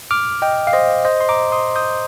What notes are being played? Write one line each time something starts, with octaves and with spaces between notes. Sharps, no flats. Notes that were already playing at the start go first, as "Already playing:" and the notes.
D6 F6
D#5 G5
F5
C5 D#5
C5 D#5
C6
A#5 D6
C6 D#6
D#6 G6